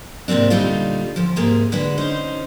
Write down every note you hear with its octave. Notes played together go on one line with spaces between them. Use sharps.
G#2 C3 A#3 C4 D4
A#2 D3 G3 A3 D#4 F4
D2 F3
G#2 C3 A#3 G#4 E5
D3 G#3 F#4 B4
C#4 D#4 C5